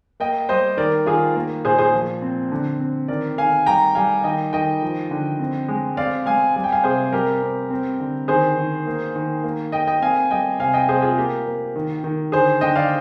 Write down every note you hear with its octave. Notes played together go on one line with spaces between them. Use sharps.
A#3 D#5 G5
G3 C5 D#5
D#3 A#4 D5
D#3 F4 G#4
A#3
A#2 G#4 C5
G#4 C5
F3
C4
D3
C4
D#3 A#4 D5
D#3 F5 G#5
G3 G5 A#5
G3 F5 G#5
D#3 D#5 G5
D#3 D#5 G5
F3
D3
C4
G#3
C4 D5 F5
G#3 F5 G#5
G3 G#5
G5
F5 G#5
C3 G#4 C5
G3 G4 A#4
C4
C4
D3
D#3 G#4 C5
D#3
A#3
D#3
A#3
A#3 D#5 G5
D#5 G5
C4 F5 G#5
G3 D#5 G5
C3 F5 G#5
D#5 G5
C3 G#4 C5
F4 G#4
A#3 G4 A#4
A#3
D#3
D#3
D3 G#4 C5
D3 D#5 G5
D5 F5